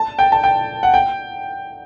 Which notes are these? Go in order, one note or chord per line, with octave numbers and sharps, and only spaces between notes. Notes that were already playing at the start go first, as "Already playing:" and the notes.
Already playing: A5
G5
A5
G5
F#5
G5